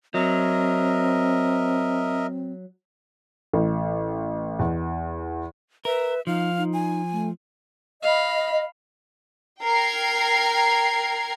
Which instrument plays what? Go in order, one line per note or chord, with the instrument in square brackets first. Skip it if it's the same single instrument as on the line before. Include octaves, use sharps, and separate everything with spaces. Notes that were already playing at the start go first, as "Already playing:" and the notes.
[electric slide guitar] F#3 [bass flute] C4 [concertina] A#4 D#5 E5
[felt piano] A1
E2
[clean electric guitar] A#4 [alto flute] B4 [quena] E5
[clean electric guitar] F3 [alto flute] D#4 [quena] F5
[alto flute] D#4
[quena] G#5
[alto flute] A3
[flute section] D#5 [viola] F5 B5
[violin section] A#4 G5 G#6 C7